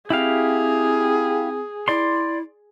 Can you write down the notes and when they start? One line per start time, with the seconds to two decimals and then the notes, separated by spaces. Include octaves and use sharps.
0.10 C4 E4 G4 G#4 F5
1.88 E4 D5 C6